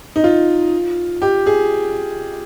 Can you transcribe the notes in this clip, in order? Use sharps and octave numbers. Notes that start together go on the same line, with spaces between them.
D#4
F4
G4
G#4